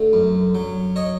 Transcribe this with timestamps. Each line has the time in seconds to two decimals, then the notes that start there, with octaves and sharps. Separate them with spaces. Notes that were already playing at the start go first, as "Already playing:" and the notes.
Already playing: D3 A3
0.13 F#2
0.55 F#3
0.96 C#5 D#5